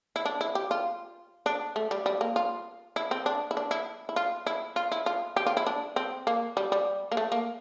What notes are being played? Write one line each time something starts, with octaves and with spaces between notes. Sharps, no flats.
E4
D4
E4
G4
F4
D4
A3
G3
G3
A#3
F4
E4
C4
D4
E4
D4
E4
E4
F4
E4
F4
E4
F4
G4
F4
E4
D4
C4
A#3
G3
G3
A#3
A3
A#3